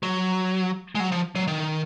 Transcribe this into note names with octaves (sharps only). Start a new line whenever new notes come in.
F#3
G#3
F#3
F3
F#3
D#3